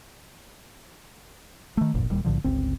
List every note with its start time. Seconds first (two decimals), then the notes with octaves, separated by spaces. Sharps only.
1.77 D#3 A3
1.94 D1 G1 F2 A#2
2.09 D1 D#2 A#2 G3
2.25 B1 A2 D3 F3
2.44 G1 C#2 C4